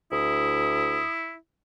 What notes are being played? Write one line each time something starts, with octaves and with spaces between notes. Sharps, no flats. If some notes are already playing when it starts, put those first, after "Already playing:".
D2 E4 D#6